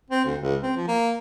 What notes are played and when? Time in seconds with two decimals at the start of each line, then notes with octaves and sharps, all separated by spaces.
0.10 C4
0.25 D2
0.41 C#2
0.63 C4
0.76 F3
0.88 A#3